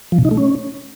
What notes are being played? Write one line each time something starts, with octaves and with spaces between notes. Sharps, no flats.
F3
B2
D#4
A3
C#4